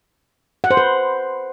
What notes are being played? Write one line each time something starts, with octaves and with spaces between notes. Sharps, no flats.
F#5
C5
B4